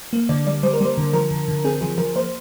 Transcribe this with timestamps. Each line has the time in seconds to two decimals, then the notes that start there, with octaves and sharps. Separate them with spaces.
0.13 A#3
0.29 D3 D5
0.47 G3 D5
0.63 G3 C5
0.73 A#4
0.81 G3 C5
0.98 D3
1.13 F3 A#4
1.31 D3
1.48 D3
1.64 C4 G#4
1.81 F3 G#4
1.98 F3 A#4
2.16 A#3 C5